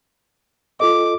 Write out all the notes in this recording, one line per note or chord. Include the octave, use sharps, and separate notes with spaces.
F4 A4 D#5 D6